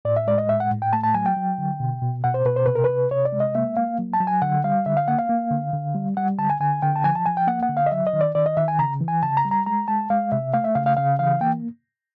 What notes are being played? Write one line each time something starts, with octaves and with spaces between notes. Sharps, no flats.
A2 D5
E5
G#3 D5
D#5
A2 E5
F#5
A2
G5
A3 A5
A5
F#3 G#5
G5
F#3
D3
B2
B2
B2 F#5
C5
B2 B4
C5
C3 B4
A#4
C3 B4
C3 C#5
D5
G#3
D#5
A#3 E5
A#3 F5
F#3
A5
F#3
G#5
D3 F#5
G3 F5
D3 E5
F5
A#3 F#5
F5
A#3
D3
D3
G3
G3 F#5
D3 A5
G#5
D3 G#5
D3 G5
A5
F3 G#5
A5
F3 G#5
G5
A#3 F#5
F#5
D3
F5
D#5
F#3 E5
D#5
D#3
D5
D#3 D5
D#5
D#3 E5
G#5
C#3 A#5
E3
G#5
C#3 A5
A#5
G3
A#5
G#3 A#5
G#3 A5
G#3 F5
C3 E5
A3 F5
E5
C#3 F5
F5
C#3 F5
E3 F5
A#3 G5